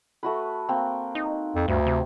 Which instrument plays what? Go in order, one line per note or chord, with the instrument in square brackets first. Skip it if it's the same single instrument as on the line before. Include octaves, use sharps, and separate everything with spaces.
[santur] A3 F#4 B4
A#3 C4
[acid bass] D#4
[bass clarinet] F2
[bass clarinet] D2 [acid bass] G2
[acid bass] C3